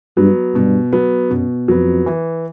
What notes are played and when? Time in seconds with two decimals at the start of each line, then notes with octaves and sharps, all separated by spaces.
0.17 G2 F#3 B3
0.54 G2 B2
0.93 F#3 B3
1.30 F#2 B2
1.68 F2 F#3 B3
2.06 E3